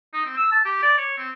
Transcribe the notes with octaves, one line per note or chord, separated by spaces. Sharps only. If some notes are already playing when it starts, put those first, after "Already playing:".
D#4
C4
E6
A5
G4
D5
C#5
C4